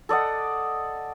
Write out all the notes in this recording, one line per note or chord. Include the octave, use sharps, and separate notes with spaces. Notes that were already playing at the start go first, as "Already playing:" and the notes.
A4 D5 D#5 F#5